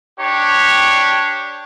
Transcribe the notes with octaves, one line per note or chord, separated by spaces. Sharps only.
D4 G4 C#5